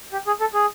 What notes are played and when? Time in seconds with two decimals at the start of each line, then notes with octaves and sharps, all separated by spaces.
0.13 G4
0.27 G#4
0.40 A4
0.54 G#4